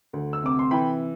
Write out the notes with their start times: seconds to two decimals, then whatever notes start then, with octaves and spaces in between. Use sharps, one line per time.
0.13 D2
0.33 E6
0.43 C3 D6
0.59 C6
0.71 E3 G5 B5